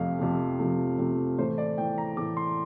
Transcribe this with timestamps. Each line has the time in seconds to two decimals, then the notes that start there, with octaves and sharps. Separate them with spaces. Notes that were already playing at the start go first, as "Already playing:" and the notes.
Already playing: F2 C3 F3 A3 F5
0.19 F2 C3 F3 A3
0.59 F2 C3 F3 A3
0.99 F2 C3 F3 A3
1.38 A2 E3 A3 C5
1.58 D5
1.78 A2 E3 A3 G5
1.98 A#5
2.17 A2 E3 A3 D6
2.37 C6